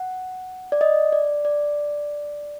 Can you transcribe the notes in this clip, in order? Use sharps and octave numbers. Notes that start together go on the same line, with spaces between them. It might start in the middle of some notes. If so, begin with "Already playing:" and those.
Already playing: F#5
D5
D#5
D5
D5